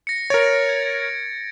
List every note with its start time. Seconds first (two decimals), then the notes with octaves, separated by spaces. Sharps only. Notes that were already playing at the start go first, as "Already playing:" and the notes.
0.07 A#6 C#7
0.30 A#4 C#5 A6 D7
0.69 G#6